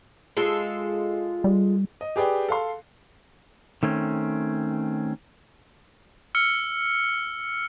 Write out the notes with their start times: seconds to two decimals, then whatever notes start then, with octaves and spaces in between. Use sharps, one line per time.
0.37 G#3 F4 A4
1.44 G3
2.01 D#5
2.16 G4 G#4 B4 D5 G5
2.49 A4 F5 C6
3.83 D#3 A3 C4 C#4
6.35 E6 F6 C#7